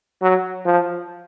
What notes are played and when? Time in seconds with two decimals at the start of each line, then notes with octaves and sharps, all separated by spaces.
0.22 F#3
0.65 F3